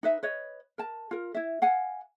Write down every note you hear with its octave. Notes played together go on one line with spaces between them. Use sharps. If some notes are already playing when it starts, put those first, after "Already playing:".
D#4 B4 E5
B4 C#5 D#5
A#4 A5
F4 A#4
E4 E5
F5 F#5 G#5